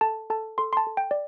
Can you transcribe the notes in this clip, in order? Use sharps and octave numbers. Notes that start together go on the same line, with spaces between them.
A4 A5
A4 A5
A4 C6
C6
A5
A4
G5
D5